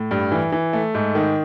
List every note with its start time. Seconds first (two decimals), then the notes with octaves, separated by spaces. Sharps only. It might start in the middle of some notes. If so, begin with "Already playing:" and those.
Already playing: A2
0.11 G2
0.32 E3
0.52 E3
0.73 A3
0.94 G#2
1.15 D#3